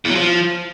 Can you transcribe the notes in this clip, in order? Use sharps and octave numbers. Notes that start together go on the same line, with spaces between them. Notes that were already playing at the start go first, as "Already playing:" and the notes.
E2
F#3
F3